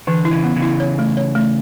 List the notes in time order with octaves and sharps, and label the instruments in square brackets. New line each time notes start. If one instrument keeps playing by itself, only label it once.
[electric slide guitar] D3 [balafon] E3
[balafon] E4
[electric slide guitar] C#3 E3
[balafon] B3
[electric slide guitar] C#3 E3
[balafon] E4
C#5
A3
C#5
A3